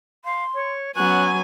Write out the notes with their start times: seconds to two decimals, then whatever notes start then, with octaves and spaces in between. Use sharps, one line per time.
0.25 F5 C6
0.55 C#5
0.96 F#3 B3 C#4 G#5 C#6 F#6